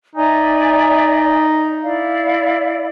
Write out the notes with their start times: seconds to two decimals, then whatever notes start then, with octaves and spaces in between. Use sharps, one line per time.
0.15 D#4 D5 E5 G#5
1.82 E4 D5 F5